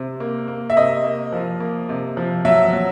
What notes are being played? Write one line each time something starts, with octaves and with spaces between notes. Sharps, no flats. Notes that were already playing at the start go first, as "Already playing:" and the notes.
Already playing: C3
A#3
A#3
E5
C3 D#5
A#3
F3
A#3
C3
F3
F#3 E5
F#3